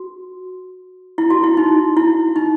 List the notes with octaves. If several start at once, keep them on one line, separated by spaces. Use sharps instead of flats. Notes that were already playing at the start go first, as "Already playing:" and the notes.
Already playing: F#4
E4
F#4
E4
D#4
E4
D#4